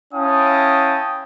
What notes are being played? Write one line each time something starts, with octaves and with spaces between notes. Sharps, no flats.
C#4 E4 F5 G5 A5 D#6